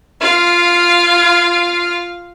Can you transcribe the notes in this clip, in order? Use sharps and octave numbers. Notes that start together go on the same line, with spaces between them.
F4 F5